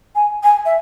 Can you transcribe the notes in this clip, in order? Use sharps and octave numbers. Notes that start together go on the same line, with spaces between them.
G#5
G#5
E5